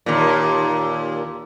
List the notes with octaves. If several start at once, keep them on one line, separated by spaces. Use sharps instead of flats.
D#2 A#2